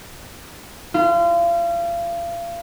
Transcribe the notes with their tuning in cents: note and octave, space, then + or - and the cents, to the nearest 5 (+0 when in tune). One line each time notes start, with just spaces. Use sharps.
F4 -35